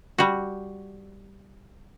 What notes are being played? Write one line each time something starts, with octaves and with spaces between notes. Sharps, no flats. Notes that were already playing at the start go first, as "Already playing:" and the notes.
G3 F#4